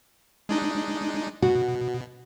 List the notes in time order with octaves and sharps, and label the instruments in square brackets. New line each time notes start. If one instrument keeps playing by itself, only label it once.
[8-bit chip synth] G#3 D4 D#4
[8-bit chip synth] B2 [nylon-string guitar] F#4